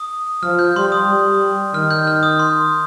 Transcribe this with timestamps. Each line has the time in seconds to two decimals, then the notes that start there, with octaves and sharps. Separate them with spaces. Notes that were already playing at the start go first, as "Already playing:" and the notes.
Already playing: D#6
0.43 F3 F6
0.59 G6
0.76 G3 C6
0.92 D#6
1.08 G3
1.74 D#3 F6
1.91 G6
2.07 F6
2.23 D#6
2.39 C6